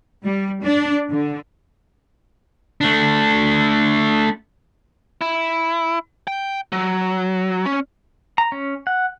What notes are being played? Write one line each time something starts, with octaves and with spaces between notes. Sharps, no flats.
G3
D4
D3
A3 D4
E4
G5
F#3
C#4
A#5
C#4
F#5